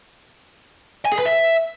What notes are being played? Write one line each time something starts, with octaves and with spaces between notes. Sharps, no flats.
G#5
G#4
B4
E5